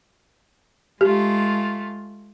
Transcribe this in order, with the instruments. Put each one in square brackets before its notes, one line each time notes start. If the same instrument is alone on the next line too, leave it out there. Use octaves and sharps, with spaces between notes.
[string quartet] G#3 A3 F4 [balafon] G4